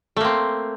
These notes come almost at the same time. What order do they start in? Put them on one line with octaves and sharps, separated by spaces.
A3 A#3 C4